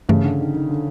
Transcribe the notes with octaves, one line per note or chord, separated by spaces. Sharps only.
G2 C#3 E3 A3
D3
D#3
D#3
D3